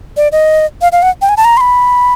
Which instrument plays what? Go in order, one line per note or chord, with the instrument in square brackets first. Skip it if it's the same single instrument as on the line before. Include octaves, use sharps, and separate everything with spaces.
[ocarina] D5
D#5
F5
F5
F#5
G5
G#5
A5
A#5
C6
B5